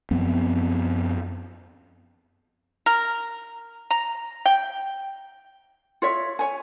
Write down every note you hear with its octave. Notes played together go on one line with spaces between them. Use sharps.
F#2 F3 B3 C4
A#4
A#5
G5
F4 C#5 E5
C#5 G#5